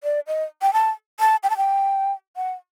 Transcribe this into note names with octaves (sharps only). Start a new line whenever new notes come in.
D5
D#5
G5
A5
A5
G5
A5
G5
F#5